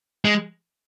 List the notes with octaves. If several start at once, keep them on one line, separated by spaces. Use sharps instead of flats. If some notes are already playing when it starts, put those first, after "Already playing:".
G#3